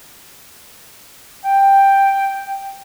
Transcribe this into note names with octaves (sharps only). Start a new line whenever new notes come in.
G5